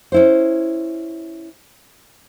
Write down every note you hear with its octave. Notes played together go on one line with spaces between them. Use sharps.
C#4 E4 C5